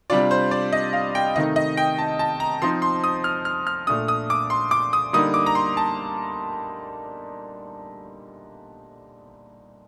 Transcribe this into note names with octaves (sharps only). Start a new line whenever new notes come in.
C3 G3 D4 F4 D5
C5
D5
D#5
F5
G5
C3 D#3 A3 D#4 D#5
D#5
G5
A5
A5
A#5
F3 C4 D#4 C6
C6
D#6
F6
F6
F6
A#2 A3 D4 D#6
D#6
D6
C6
D6
D#6
D3 G3 A#3 D#4 D#6
D6
A#5
C6
A5